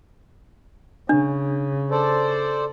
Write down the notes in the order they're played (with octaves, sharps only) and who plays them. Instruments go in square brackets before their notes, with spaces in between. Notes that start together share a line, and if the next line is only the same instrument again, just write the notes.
[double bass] C#3 [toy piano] D4
[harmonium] A4 C5 D5